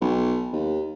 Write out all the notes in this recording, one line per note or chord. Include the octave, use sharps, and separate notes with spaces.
B1
D#2